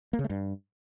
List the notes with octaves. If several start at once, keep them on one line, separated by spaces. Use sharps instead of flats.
A#3
C#3
A3
G2